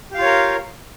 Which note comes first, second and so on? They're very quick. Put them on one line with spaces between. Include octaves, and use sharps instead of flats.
G4 F5 F4 C#5 A#4